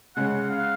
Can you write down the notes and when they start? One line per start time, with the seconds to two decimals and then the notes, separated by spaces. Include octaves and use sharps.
0.16 C#3 G#3 C#4 F#5
0.51 F5